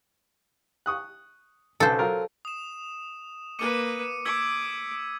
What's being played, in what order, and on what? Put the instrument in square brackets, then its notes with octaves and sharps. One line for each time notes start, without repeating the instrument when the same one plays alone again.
[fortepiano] C#6 D#6 F#6
[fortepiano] B1 C#3 [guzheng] A4 C5
[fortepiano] F#3 F4 A#4
[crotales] D#6 E7
[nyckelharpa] A#3 B4 [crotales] D6 C#7 D#7
[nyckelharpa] D6 [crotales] E6 G#6 B6